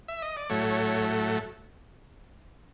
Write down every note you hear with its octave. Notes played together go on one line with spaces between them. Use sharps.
E5
D#5
D5
A2 F#3 A3 C#5